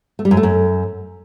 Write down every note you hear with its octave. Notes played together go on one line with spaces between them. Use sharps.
A3
G3
F#2
A3
F#2